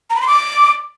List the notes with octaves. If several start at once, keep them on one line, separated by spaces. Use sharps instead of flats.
A#5
B5
C6
D6